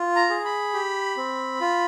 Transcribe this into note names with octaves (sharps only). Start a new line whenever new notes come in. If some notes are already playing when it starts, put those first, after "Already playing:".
Already playing: F4
A#5
G#4
B5
G4
C4
F4